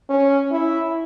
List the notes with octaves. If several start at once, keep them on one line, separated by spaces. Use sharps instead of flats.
C#4
E4